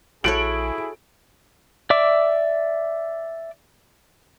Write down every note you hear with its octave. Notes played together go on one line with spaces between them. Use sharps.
A#1 E4 F#4 G#4 A4 C#5 D7 F#7
D5 E5 D6